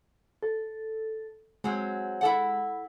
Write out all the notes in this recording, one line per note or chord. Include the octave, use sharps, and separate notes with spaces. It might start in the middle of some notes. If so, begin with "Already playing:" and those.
A4
F#3 G#3 C4
E4 A4 F#5